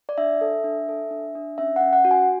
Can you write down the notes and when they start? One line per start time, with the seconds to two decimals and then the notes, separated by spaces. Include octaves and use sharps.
0.09 D5
0.18 D4 E5
0.41 A4
0.64 D4
0.89 A4
1.11 D4
1.35 D4
1.58 C#4 E5
1.76 C#4 F#5
1.93 F#5
2.05 F#4
2.11 G#5